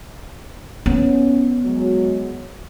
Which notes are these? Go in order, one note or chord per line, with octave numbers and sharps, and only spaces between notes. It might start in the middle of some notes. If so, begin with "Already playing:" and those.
B3 C#4
F#3 G#3